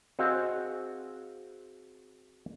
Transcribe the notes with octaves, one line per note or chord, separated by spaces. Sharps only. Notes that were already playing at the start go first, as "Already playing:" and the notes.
C4 F#4 G#4 D#5 F5